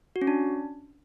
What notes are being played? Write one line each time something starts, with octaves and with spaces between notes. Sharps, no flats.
F#4
C#4
D4